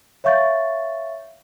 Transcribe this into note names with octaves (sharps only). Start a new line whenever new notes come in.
C#5 E5 F5 C#6 G6 A6